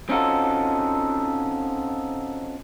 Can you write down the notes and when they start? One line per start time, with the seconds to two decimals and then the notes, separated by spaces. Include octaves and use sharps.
0.09 C4 C#4 D#4 F4 F#4 A4